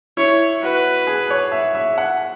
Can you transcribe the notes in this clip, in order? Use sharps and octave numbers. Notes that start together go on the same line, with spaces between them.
E4 C#5
F#4 B4
G#4
C#5
E5
E5
F#5